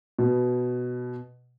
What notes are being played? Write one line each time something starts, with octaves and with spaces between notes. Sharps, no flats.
B2